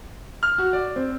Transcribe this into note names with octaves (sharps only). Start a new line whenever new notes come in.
F6
F#4
D5
C4